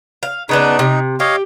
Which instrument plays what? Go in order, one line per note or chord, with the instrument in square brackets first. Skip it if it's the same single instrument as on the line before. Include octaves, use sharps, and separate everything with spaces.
[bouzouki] F5
[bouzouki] C#3 B3 D4 [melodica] D#4
[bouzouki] C3
[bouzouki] G4 [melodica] C#5 D#5 F5